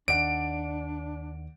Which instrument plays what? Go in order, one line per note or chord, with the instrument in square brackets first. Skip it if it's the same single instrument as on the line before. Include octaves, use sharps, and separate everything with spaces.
[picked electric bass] D#2 [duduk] D4 [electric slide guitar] D5 F#5 [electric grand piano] D7